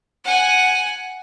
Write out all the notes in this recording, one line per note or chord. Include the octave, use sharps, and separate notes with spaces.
F#5 G#5